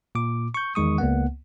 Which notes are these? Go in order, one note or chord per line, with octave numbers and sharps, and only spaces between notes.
A#2 D6
C#6 G6
E2 D#3 G#3 C#6 D#6
C#2 A#3 B3 F#5